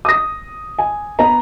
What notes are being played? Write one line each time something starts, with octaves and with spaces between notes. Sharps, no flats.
D#6 A#6
G#5
B3 B4 A#5